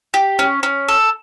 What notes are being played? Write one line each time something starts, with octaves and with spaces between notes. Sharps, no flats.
G4
C#4
C#4
A4